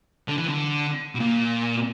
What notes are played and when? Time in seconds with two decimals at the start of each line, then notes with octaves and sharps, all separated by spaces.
0.28 D3
0.38 E3
0.48 D3
1.15 B2
1.20 A#2